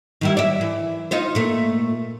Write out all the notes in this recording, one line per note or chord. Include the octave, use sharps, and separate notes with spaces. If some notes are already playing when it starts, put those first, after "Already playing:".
D#3 G3 E4
D5 E5
E3
D#4 F4 C5
A#2 A3